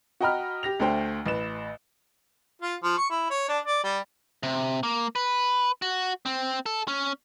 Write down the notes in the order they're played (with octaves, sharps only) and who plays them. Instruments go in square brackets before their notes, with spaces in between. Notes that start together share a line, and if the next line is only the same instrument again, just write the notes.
[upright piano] F#4 D#5 G5 A#5 B5 F6
G4 A#6 F7
D2 A3 D4 C5 G5
A1 B4 E7
[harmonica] F4
F3
C#6
E4
C#5
D4
D5
G3
[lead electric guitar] C3
A#3
B4
F#4
C4
A4
C#4